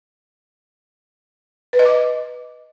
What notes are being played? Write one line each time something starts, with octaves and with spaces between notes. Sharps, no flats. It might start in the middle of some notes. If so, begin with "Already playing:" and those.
B4
D#5
D6